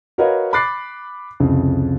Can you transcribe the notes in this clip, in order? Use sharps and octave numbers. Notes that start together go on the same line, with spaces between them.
F#4 A#4 B4 C#5 D#5 F5
B5 D6 F#6 A6 C7
C2 F2 C#3